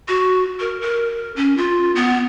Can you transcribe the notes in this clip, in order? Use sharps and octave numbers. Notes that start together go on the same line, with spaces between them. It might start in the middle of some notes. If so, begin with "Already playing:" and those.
F#4
A#4
A#4
C#4
F4
B3